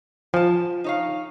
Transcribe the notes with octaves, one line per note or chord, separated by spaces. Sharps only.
F3 G#5 A5
D#4 C#5 F5